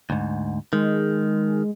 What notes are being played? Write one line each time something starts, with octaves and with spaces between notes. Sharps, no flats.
D2 G#2
D#3 G#3